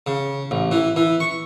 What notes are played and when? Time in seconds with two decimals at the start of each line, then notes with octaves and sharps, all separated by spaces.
0.07 C#3
0.51 A1
0.71 E3
0.96 E3
1.20 C#6